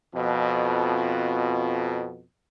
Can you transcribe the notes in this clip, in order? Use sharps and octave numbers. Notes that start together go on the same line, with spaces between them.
F2 B2